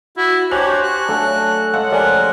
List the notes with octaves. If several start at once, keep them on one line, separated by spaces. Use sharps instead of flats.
E4 F#4
D4 F#4 G4 C5 C#5 G#5 F7 F#7
F#6
F#3 A3 D4 A4 F5 G#5
C#3 G#3 A4 F5 F#5
F3 G4 A#4 D5 G#5